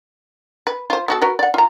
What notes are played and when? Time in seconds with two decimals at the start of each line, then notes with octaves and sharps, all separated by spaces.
0.67 B4
0.90 F4 C5
1.08 B3 F#4 A4
1.22 F#4 A#4 B4
1.39 D5 F#5
1.54 F4 A#5